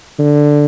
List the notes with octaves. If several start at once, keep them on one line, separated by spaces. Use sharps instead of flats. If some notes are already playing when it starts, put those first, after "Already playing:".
D3